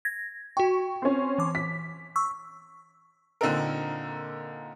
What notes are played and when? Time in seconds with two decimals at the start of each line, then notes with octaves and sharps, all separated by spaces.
0.05 G#6 A#6
0.57 F#4 G5 C#6
1.02 C4 C#4
1.38 E3 D6
1.55 B6
2.16 C#6 E6
3.41 A#2 D3 C4 D#4 A4 A#4